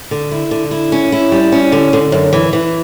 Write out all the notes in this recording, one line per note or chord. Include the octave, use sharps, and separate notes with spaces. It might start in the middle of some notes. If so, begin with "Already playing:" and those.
D3
E4
D3
E4
C#4
E4
G3
C#4
D3
D3
F#2
E3
E3